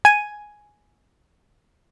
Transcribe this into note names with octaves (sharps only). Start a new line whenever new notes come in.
G#5 D#7